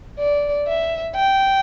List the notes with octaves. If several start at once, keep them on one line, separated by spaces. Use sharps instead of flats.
D5
E5
G5